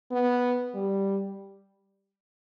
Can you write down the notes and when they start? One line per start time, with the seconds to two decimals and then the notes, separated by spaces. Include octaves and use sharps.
0.11 B3
0.74 G3